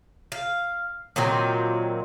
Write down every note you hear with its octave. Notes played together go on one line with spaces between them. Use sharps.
F5
A#2 D#3 F#3 C4